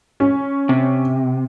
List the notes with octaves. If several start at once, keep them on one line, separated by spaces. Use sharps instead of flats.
C#4
C3